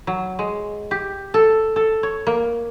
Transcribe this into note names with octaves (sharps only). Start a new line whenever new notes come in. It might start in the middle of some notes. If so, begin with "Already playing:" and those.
F#3
G#3
G4
A4
A4
C#5
A#3